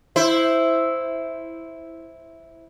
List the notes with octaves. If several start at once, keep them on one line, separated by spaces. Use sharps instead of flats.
E4 C5